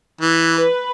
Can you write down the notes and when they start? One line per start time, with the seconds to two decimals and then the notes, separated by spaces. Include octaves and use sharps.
0.21 E3
0.57 B4